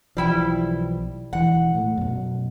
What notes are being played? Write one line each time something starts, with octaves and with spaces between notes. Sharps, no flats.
B1 E3 F3 G3 E4 G5
E1 E3 F#5
A2 A3
F#2 B2